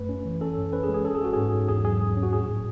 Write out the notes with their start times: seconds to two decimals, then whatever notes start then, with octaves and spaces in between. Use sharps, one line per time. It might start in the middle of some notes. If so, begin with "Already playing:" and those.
Already playing: F#2 A3 B4
0.09 C#4
0.25 E3
0.41 C#4 A4
0.57 F#2
0.73 C#4 B4
0.83 G#4
0.89 G#3
0.94 G#4
1.04 C#4 A4
1.15 G#4
1.21 C#4 F#4
1.33 G#2 G#4
1.53 G#2
1.68 E2 G#4
1.84 F#3 G#4
2.01 F#3
2.17 C#4
2.23 F#4
2.33 A2 G#4
2.48 F#3